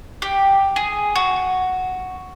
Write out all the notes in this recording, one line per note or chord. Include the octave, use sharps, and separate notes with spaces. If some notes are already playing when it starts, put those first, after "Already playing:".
G4
G#4
F#4